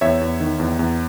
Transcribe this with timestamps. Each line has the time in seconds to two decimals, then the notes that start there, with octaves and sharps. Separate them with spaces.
0.01 E2 C#5 E5
0.21 E2
0.40 D#3
0.59 E2
0.79 E2